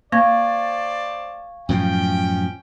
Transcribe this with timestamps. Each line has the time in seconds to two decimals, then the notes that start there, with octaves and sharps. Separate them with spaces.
0.12 A#3 C5 D5 F5 A5 C#6 G#6
1.69 F#2 A2 F3 C#4 G5